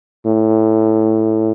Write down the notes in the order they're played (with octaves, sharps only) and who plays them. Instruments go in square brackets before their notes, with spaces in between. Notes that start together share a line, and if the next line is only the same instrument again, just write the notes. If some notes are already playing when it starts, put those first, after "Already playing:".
[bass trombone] A2